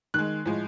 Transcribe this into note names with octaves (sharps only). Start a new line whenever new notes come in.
D#3 G#3 F#6
A2 F3 G#3